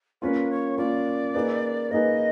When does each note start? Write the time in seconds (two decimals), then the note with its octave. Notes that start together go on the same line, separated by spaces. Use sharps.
0.22 A#3 C#4 F4 B4
0.50 C#5
0.77 A#3 C#4 F4 D5
1.34 A#3 D#4 G#4 B4
1.91 A#3 D#4 G#4 B4 D#5